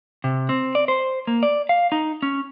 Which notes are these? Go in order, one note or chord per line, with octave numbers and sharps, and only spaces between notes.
C3
C4
D5
C5
A#3
D5
F5
D#4
C#4